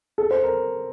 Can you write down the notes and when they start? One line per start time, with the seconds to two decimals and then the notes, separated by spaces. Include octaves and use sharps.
0.18 A4
0.31 C5
0.44 A#4